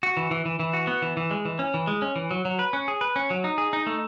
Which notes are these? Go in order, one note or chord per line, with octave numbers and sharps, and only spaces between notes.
F#4
E3
E3
E3
E3
F#4
B3
E3
E3
G#3
E3
C#4
E3
G#3
C#4
E3
F#3
F#3
B4
C#4
G#4
B4
C#4
F#3
D#4
G#4
D#4
A3